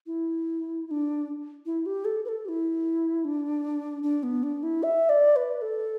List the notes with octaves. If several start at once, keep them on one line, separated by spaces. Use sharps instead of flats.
E4
E4
D4
E4
G4
A4
B4
A4
G4
E4
D4
D4
B3
D4
E4
E5
D5
B4
A4